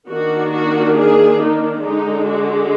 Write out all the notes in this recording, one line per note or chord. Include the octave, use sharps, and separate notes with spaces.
D#3 A#3 D4 F#4
F#4
G#4
D#4
D3 G#3 D4 D#4
F#4